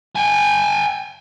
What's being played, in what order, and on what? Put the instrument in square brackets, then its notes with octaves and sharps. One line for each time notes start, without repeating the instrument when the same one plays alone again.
[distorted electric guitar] G5 G#5